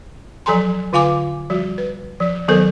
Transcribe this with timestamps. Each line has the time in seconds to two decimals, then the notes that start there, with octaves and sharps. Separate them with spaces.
0.46 F3 F#3 A4 G#5 A#5 C6
0.93 D3 F4 F5 G#5 D6
1.50 F3 G3 F#4
1.78 B4
2.20 F3 D5
2.48 D#3 F#3 B3 A4 A#4 C5